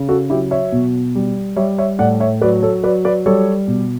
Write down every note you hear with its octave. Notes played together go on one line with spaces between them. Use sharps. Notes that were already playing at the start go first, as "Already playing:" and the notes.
Already playing: C#3
F#4 A4
F#3 E4 G4
C#5 E5
B2
G3
G3 C#5 E5
C#5 E5
A2 D5 F#5
C#5 E5
F#3 B4 D5
A4 C#5
F#3 B4 D5
B4 D5
G3 A4 C#5
B2